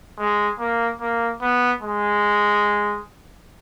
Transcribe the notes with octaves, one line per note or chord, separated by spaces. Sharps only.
G#3
A#3
A#3
B3
G#3